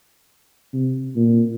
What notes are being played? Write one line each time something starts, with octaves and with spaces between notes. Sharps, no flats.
C3
A#2